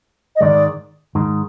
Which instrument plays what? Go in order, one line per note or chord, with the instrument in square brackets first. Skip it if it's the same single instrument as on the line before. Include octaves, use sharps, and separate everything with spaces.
[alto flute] D#5
[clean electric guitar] G#2 D#3 G#3 [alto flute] D5
[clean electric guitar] G#2 D#3 G#3